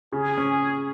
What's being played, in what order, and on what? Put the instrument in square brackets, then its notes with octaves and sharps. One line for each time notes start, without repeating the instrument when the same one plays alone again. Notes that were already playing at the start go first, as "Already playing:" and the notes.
[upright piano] C#3 [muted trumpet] G#4
[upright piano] C#4